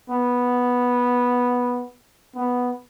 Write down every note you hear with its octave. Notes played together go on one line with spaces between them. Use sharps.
B3
B3